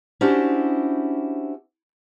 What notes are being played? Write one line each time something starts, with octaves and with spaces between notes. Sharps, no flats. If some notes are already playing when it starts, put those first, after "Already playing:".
C#4 D4 E4 F#4 G4 C5